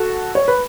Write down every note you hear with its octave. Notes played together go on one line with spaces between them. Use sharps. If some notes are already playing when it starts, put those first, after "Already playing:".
Already playing: F#4 A4
C#5
B4